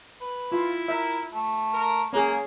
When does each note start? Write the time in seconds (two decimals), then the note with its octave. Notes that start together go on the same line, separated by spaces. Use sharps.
0.21 B4
0.52 E4 F4
0.88 A#4 E5
1.33 A3
1.73 A#4
2.13 A#3 C#4 G#4